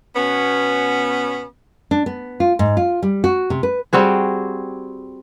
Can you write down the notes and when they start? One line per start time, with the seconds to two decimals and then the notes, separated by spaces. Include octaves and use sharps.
0.16 B2 B3 C#4
1.91 D4
2.06 B3
2.40 F4
2.59 G#2
2.77 F4
3.03 G3
3.24 F#4
3.50 C3
3.63 B4
3.93 G3 C4 F#4 G#4